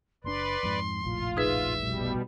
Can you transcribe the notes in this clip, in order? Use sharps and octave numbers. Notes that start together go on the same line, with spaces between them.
F#1 B2 D4 B4 D5 C6
F2 G#2
F1 A#1 A2 F4
D#4 G#4 B4 E5
B2 G3